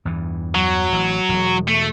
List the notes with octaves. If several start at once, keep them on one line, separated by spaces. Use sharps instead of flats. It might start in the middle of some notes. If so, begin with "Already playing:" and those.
E2 G2 E3
F#3
A1 E3
E1 B2
A3